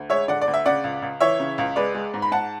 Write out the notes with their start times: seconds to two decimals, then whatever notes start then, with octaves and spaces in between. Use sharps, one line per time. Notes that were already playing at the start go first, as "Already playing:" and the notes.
Already playing: D2
0.10 G#3 C#5 E5
0.28 D3 D5 F#5
0.42 D5
0.48 D2
0.54 E5
0.66 C#3 D5 F#5
0.84 C#2
1.02 C#2
1.20 E3 C#5 E5
1.40 C#3
1.58 C#2
1.76 G#3 B4 D5
1.95 G#3
2.14 G#2
2.22 B5
2.31 G#2 F#5 A5